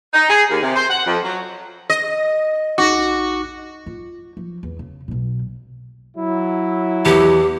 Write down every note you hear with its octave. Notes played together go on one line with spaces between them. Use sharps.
D#4
G#4
D#2
C3
C5
F#5
F2
F#3
D#5
A#1 D#4 F#4 D6
F4
F3
E2
C#3
B1 B2
F#3 E4
E2 G4 C#7